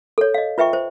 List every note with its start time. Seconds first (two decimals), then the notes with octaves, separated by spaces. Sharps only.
0.18 A4 C#5
0.34 D#5 F5
0.58 F4 B4 E5 G5 C#6
0.73 C5